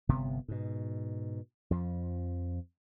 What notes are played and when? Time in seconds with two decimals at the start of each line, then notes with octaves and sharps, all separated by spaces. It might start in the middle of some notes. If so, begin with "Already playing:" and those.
0.09 G1 C3 B3
0.48 G#2 B2
1.71 F2 F3